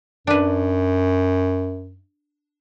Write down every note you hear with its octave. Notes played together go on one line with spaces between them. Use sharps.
F#2 D4 B4